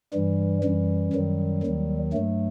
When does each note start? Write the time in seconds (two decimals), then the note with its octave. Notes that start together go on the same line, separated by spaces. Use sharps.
0.13 G2 E3 G3
0.63 F#2 E3 G3
1.13 F#2 D#3 F#3
1.63 D#2 D#3 F#3
2.13 G2 F#3 A3